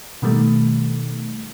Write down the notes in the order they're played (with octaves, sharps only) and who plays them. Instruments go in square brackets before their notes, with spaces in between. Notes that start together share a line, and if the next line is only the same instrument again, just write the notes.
[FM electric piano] B2 D#3 G3 A3